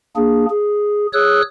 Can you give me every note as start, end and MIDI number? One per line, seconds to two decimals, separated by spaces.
0.16 0.46 58
0.16 0.46 62
0.16 0.46 68
0.50 1.06 68
1.13 1.42 68
1.13 1.42 73
1.13 1.42 87
1.13 1.42 88
1.13 1.42 90